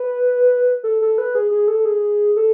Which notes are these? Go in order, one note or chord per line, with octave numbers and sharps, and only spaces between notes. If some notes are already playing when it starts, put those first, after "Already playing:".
Already playing: B4
A4
A4
B4
G#4
G#4
A4
G#4
A4